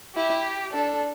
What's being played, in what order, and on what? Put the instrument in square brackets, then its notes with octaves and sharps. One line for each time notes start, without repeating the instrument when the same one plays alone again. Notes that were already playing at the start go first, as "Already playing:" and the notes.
[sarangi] E4 [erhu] G4
[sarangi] D4 [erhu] A4